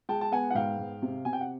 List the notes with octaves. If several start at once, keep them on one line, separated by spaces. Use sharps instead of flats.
G#3 G5 A5
A5
B3 F#5 G#5
F#5
G#2 F5 G5
G#2
C3
C3 G#5
G5
F#5